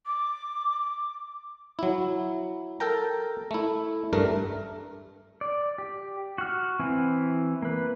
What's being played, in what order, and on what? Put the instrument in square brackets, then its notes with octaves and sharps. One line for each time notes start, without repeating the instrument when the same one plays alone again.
[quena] D6
[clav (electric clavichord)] F#3 E4
A4 A#4 G5 A#5
A3 E4
G2 A3 A#4
[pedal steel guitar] D5
G4
F#4 F6
E3 C4 E4 G#5
A#3 B4